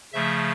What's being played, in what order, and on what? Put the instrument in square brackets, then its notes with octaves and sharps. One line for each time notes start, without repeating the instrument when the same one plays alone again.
[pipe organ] C#3 F3 A3 E5